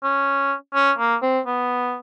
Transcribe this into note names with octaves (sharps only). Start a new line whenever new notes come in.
C#4
C#4
A#3
C4
B3